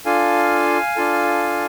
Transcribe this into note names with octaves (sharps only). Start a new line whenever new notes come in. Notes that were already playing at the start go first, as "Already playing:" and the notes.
D4 F4 A4 F5 G#5
D4 F4 A4